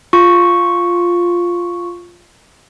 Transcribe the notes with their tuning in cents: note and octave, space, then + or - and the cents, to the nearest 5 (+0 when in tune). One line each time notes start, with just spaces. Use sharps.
F4 +0 C#6 +0